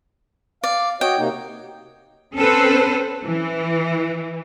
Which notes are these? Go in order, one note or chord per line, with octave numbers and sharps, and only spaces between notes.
D5 F5
F#4 C#5 D#5 G5
C3 A#3 D#4
C4 C#4 A4 B4 C5
E3